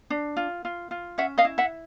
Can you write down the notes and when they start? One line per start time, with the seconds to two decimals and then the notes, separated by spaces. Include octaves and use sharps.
0.10 D4
0.37 F4
0.65 F4
0.91 F4
1.18 C#4 E5 F#5
1.38 D#5 F5
1.45 E4
1.58 E5 F#5